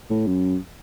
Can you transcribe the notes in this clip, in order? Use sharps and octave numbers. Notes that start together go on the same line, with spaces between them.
A2
F#2